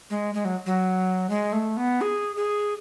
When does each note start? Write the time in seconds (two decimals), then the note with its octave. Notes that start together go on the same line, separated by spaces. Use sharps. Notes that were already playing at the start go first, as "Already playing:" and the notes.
0.10 G#3
0.34 G#3
0.45 F#3
0.66 F#3
1.29 G#3
1.53 A3
1.77 B3
2.01 G#4
2.36 G#4